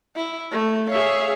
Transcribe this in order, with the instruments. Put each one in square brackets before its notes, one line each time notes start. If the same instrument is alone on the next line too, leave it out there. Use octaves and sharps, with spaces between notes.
[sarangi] E4
A3
[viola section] G#4 E5 F5 [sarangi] C#5